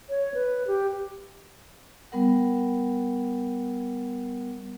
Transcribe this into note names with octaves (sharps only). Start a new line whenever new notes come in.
C#5
B4
G4
G3 B3 A#4 F#5